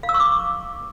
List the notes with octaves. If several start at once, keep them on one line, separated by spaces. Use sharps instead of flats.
F5
E6
C#6
D6